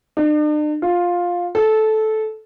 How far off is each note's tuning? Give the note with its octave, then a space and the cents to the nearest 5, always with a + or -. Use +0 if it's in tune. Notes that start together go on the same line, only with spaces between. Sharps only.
D4 +45
F4 +10
A4 -15